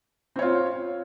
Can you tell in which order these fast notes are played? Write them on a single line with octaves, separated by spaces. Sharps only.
C4 C#5 F4